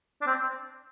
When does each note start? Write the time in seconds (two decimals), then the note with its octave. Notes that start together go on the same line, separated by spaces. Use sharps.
0.22 D4
0.27 C4